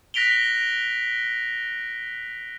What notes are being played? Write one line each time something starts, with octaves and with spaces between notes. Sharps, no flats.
F#6 A#6 B6 D7 F7 G7